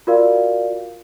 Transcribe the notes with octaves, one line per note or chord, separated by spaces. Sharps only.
F4 F#4 A#4 D5 F5